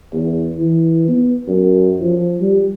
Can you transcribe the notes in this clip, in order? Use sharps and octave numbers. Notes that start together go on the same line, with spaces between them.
E2
E3
B3
F#2
F3
G3